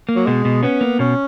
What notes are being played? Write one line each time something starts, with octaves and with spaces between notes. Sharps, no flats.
A#3
F#3
B2 G#3
B2
B3 C#4
A#3
B2 C#4